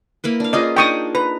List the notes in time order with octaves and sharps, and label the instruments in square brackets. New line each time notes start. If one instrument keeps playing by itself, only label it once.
[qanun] A#3 E4 B4
D4 F5
[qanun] C#4 F4 G#4 [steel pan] D5 D#5
[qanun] D4 D#4 A#5 [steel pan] G5 C#6 D#6
[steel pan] B4 [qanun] A#5